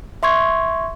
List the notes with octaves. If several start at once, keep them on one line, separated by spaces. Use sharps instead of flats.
E5 C6 C#6 G#6